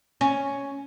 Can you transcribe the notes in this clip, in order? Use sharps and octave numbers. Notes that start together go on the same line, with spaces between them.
C#4